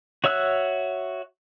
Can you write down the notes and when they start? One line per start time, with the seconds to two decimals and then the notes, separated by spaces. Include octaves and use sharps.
0.24 F#4 C#5 E5 E6 F#6